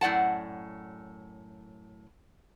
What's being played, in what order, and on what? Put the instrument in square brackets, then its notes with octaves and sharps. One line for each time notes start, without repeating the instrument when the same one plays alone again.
[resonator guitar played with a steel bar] F#2 A2 D5 F#5 A5